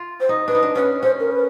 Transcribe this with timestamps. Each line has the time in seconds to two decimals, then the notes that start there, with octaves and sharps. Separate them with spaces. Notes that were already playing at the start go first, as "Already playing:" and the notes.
Already playing: F4
0.20 C5
0.29 D#4
0.48 D4 B4
0.55 D#4
0.63 D4
0.75 C#4 B4
1.03 C#4 C5
1.20 A#4
1.31 B4